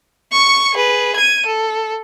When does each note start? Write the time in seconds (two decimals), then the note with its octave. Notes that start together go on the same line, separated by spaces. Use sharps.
0.32 C#6 C#7
0.75 G#4 B4
1.16 G#6 D#7
1.46 A4